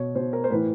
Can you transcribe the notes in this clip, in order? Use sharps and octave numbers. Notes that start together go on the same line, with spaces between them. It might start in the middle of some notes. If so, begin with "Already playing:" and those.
Already playing: B2 C#5
B2 C5
A#4
C5
A2 E3 B4